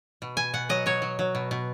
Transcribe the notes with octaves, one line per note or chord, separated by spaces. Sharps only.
B2
B2 G#5
B2 F#5
F#3 D#5
F#3 C#5
F#3
F#3
B2
B2